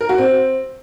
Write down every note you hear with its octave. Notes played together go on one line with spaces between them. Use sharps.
A#4
F#4
C4